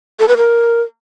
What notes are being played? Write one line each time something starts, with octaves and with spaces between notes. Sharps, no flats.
A4
B4
A#4